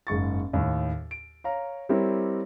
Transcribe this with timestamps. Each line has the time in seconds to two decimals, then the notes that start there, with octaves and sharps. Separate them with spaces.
0.07 F#1 G#2 C#6 A6
0.53 D#2 A2
1.11 D7
1.44 C#5 F5 A#5
1.89 G3 C4 E4 G4 A#4 C#5